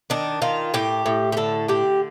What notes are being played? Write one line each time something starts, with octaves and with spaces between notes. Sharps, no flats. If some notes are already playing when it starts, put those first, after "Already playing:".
D#3 D4
D#3 F4
A2 G4
A2
G4
D3 A4
D3 G4